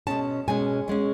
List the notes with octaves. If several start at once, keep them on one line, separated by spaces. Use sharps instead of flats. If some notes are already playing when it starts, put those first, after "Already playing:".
B2 G#3 C#4 A5
B2 G#3 C#4 G#5
B2 G#3 C#4